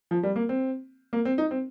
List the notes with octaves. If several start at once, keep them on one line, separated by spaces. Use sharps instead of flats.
F3
G3
A#3
C4
A#3
C4
D#4
C4